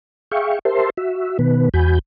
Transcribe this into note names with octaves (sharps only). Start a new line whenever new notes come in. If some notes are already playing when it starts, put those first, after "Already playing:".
G#4 E5 F5 G5 C#6
G4 A#4 C5 E5 A5 C6
F#4 E5
B2 D#3 B3 B4
E2 F#4 G#5 B5 G6